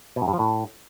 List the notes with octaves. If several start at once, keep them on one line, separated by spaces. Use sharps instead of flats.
B2
F#2
G2
F3
A2